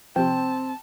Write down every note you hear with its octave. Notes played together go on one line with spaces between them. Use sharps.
C3 F3 C4 G5 A5